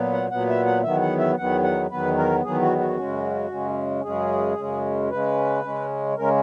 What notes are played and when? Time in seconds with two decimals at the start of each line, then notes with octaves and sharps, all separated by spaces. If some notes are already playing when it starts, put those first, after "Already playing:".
Already playing: A#2 F#3 B3
0.13 F#5
0.31 A#2 F#3 B3 F#5
0.49 E5
0.66 F#5
0.84 E2 D#3 F#3 B3 E5
1.02 F#5
1.19 E5
1.37 E2 D#3 F#3 B3 F#5
1.63 F#5
1.90 E2 D#3 F#3 B3 B4
2.18 A#4
2.44 E2 D#3 F#3 B3 G#4
2.62 F#4
2.79 F#4
2.97 F#2 C#3 G#3 C#4
3.51 F#2 C#3 G#3 C#4
4.04 F#2 C#3 G#3 C#4 G#4
4.58 F#2 C#3 G#3 C#4
5.11 C#3 G#3 C#4 B4
5.64 C#3 G#3 C#4
6.17 C#3 G#3 C#4 A#4